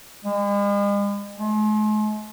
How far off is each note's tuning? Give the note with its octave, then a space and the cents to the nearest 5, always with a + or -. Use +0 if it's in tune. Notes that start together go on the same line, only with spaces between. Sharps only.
G#3 -45
G#3 +45